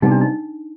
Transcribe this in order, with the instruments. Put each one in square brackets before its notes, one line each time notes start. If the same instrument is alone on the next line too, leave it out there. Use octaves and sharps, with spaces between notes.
[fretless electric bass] C3 G3 B3 [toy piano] D#4
[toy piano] D4
D#4